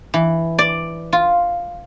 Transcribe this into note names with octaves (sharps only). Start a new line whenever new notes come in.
E3
D5
F4